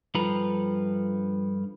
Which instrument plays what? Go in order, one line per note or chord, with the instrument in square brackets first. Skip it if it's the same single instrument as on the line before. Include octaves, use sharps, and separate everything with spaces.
[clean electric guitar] G2 F3 A4 B4 A#5